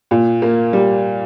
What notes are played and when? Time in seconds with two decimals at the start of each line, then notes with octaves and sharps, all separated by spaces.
0.11 A#2
0.42 A#3
0.73 G3